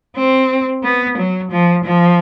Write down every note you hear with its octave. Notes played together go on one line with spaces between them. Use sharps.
C4
B3
F#3
F3
F3